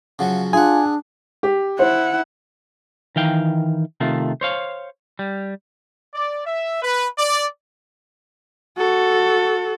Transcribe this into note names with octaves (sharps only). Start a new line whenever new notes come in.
C#3 F3 F#3 F#5
D4 F4 G#4 F#5 G#5
G4
E4 C5 F#5
D#3 E3 F5 G5
C3 D#3 A3 F4
C5 C#5 F5
G3
D5
E5
B4
D5
F#4 A4